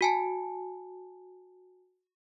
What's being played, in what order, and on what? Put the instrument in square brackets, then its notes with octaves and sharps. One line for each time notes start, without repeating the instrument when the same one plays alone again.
[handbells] F#4 G#5 A5